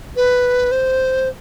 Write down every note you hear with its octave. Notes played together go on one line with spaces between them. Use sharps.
B4
C5